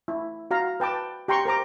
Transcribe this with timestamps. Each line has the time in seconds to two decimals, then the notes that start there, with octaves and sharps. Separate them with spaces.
0.08 E4
0.51 F#4 F5 A#5
0.80 B4 G5 A5 D6
1.28 G4 G5 A#5 C6 C#6
1.45 A#4 C5 A#5 D6